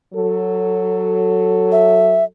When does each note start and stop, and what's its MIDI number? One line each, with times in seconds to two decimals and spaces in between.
0.14 2.25 54
0.14 2.25 69
1.72 2.24 76